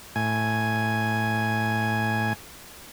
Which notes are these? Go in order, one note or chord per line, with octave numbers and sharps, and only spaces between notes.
A2 G#5